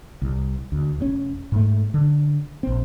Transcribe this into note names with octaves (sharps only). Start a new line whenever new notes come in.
C2
D2
F1 A2 C#4
G#2 A3
D3
A#1 C4